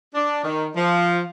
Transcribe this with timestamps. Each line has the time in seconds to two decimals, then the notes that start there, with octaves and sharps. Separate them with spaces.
0.14 D4
0.44 D#3
0.75 F3